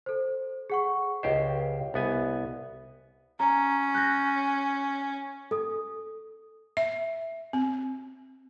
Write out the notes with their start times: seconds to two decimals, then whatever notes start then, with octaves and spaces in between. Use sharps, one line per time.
0.06 A4 C5
0.70 G#4 F#5 C#6
1.23 C#2 G4 C5 D#5
1.94 C2 B3 G#5
3.39 C#4 A#5
3.95 F#6 G6 A#6
5.51 A4 D#6
6.77 E5
7.53 C4